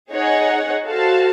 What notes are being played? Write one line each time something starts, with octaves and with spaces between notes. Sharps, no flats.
D#4 G#4 C#5 F#5
F#4 A4 C5 F5 A5